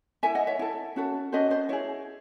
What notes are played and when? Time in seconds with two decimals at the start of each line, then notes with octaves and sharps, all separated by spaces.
0.23 E4 A4 E5 G#5
0.35 D#5 F#5
0.47 C#5 E5
0.59 E4 A4
0.96 C#4 F#4 A4
1.32 C#4 F#4 A4 C5 D#5
1.50 C5 D#5
1.69 E4 G#4 C#5